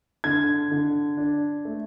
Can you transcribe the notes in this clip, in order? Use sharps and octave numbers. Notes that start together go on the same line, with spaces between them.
D3 G#6
D3
D4
A3